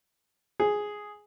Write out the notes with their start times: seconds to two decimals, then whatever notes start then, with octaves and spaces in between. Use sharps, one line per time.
0.60 G#4